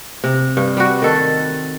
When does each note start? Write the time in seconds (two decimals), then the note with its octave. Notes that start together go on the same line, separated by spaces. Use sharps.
0.24 C3
0.57 G2
0.77 G3 F#4
1.02 D#3 A4